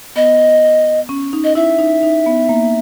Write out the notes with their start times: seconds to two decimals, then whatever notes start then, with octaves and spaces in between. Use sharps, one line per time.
0.16 B3 D#5
1.09 C#4
1.33 D#4
1.44 D#5
1.55 E4 E5
1.79 D#4
2.03 D#4
2.26 B3
2.49 A#3